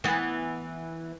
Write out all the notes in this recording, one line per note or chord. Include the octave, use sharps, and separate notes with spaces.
E3 B3